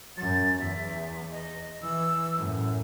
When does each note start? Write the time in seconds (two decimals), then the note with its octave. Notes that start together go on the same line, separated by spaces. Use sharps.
0.17 F#2 A6
0.59 E2 E5
1.31 D#5
1.82 E3 E6
2.37 F#2 A2